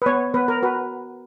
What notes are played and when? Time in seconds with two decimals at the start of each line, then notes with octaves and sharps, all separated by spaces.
0.02 B4
0.06 B3 C#5
0.34 B3 B4
0.48 A#4
0.63 F#4 B4